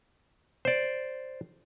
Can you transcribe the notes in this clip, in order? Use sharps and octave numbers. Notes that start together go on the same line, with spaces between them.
C5 D5